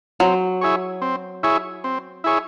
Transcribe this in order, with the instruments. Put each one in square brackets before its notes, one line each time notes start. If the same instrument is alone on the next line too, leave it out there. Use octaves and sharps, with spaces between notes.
[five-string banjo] F#3 [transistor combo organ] C4
[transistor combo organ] E4 G#4 C#5
C4
E4 G#4 C#5
C4
E4 G#4 C#5